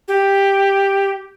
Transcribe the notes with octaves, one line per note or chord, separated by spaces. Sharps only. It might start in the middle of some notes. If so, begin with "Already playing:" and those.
G4